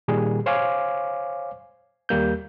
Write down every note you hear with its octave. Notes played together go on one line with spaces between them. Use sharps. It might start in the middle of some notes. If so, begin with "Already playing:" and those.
A#2 D#3 G3 G#4
C5 C#5 F5 G#5 D6
D#2 G3 A#3 G6